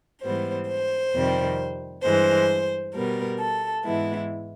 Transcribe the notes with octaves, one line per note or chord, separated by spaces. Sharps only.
G#2 E3 G3 B3 C5
C5
F2 C3 D#3 G3
G2 E3 G#3 C5
B2 G3 B3 A#4
A4
G#2 E3 G#3 B3 E4